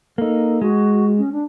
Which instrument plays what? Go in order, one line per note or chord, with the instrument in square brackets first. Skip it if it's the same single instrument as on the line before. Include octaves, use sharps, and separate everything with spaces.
[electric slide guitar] A#3 D#4 [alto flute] A4
[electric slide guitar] G#3 [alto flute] F#4
[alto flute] C#4
D4